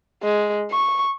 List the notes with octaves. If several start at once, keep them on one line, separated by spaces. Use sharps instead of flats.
G#3
C#6